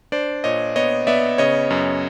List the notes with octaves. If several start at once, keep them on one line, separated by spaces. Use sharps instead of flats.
D4 C5 D5
A#2 C#5 D#5
B3 C#5 D#5
B3 D5 E5
C#3 C#5 D#5
F#2